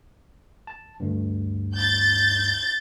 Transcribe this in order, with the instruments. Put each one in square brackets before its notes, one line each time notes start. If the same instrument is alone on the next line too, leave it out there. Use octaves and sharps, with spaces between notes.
[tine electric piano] A5
D2 G2
[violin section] G6 A6